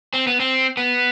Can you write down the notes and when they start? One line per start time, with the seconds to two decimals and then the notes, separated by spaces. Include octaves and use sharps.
0.14 C4
0.27 B3
0.40 C4
0.77 B3